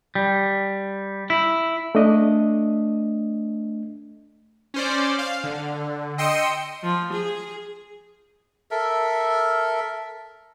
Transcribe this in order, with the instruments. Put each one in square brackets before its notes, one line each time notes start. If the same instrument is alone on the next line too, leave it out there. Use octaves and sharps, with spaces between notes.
[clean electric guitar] G3
E4
[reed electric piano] A3 D4 D#5
[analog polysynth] C#4 C5 D5
F5
D3
D#5 G5 C6 D#6 E6 C#7
[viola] F3
G#4
[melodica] A4 A#4 E5